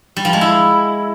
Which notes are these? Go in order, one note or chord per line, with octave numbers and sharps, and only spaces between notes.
G3
F3
G#3
E4